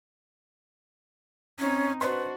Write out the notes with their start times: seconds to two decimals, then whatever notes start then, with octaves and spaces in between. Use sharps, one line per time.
1.59 C4 C#4 D#4
2.01 D4 F#4 B4 C5 D#5 C6